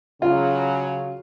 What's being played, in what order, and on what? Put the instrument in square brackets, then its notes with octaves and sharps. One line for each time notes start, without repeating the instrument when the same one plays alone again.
[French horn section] C#3 F#3 [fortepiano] F4